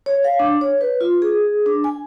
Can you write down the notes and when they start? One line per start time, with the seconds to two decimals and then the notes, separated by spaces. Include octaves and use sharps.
0.06 C#5
0.24 F5
0.39 D4
0.61 C#5
0.81 B4
1.01 F4
1.22 G#4
1.66 D4
1.84 G#5